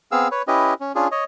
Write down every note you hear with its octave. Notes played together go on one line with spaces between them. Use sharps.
B3 C4 G#4 F5 E6
B4 C#5
C#4 E4 G4 B4 D#5
C#4
C#4 D4 F4 G#4
C#5 D#5